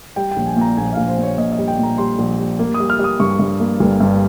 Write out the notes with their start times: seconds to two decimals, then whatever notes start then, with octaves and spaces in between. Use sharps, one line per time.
0.16 G3 G5
0.31 G5
0.36 A#1
0.47 G#5
0.56 A#2
0.61 A#5
0.77 A#1 G#5
0.93 A#1 F5
1.08 C5
1.18 A#2
1.23 C#5
1.38 A#2 D#5
1.52 D#5
1.58 G3
1.68 G5
1.78 A#2
1.83 A#5
1.98 G3 C6
2.18 A#1
2.39 G3
2.59 A#3
2.74 D#6
2.80 G3
2.90 F6
2.99 G3 D#6
3.20 G2 C#6
3.39 G2
3.60 A#3
3.80 G1
4.00 G2